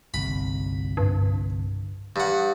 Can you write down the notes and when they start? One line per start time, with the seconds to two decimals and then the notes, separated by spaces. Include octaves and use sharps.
0.14 G1 C2 B5
0.97 G2
2.16 G2 F#5